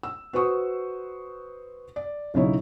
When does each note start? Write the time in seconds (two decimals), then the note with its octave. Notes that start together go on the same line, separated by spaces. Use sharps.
0.03 E6
0.33 F#4 B4 C5 C#6 D#6
1.96 D5
2.34 B1 C#3 C#4 D#4 E4 C#5